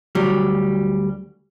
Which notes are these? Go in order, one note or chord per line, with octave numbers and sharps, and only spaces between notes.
D2 F#3 G3